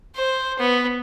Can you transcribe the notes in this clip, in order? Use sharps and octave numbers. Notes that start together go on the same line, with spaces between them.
C5
B3